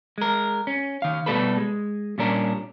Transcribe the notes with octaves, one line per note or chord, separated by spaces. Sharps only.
G#3 A#4
C#4
D#3 F5
B2 G3 A3 A4 B4
G#3
A#2 G3 C#4 D4 A#4